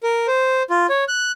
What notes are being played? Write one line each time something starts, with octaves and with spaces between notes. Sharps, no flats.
A#4
C5
F4
C#5
F#6